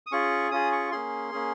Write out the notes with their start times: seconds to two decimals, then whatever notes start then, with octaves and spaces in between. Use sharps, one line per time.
0.07 D#6
0.12 C#4 F4 G#4 C#6
0.51 C#4 F4 G#4 D#6
0.72 C#6
0.92 A#3 C#4 G#4 C6
1.32 A#3 C#4 G#4